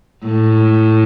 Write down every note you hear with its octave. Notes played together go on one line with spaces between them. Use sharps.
A2